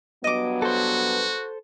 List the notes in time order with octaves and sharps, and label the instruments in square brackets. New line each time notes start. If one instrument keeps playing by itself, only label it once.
[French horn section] G2 F#3 B3 [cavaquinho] D#5 D6
[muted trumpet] F#4 [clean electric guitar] A4 C5